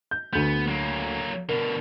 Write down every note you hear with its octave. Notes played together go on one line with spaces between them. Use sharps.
G6
D2 B3 G6
F#3 A#3
B2 D3 A#4